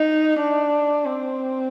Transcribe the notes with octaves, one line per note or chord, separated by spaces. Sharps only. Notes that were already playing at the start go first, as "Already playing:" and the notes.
Already playing: D#4
D4
C4